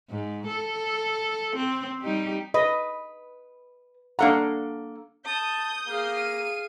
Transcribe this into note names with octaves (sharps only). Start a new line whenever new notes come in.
G#2
A4
C4
G3 D#4 G4
B4 D#5
A#3 D4 A4 F5 F#5 A#5
A5 D#6 G6
A#3 G#4 F5
D#7